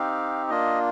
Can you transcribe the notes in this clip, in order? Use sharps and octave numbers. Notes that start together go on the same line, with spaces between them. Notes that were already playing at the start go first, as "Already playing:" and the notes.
Already playing: C4 D#4 G4 F5
A#3 D4 F4 D#5